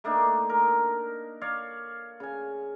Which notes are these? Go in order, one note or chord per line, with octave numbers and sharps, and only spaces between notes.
A3 A#3 D4 D#4
A#4
C#5 D5 F5
C#3 G#5